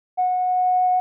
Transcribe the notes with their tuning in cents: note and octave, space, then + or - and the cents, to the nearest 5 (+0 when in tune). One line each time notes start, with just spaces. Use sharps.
F#5 -20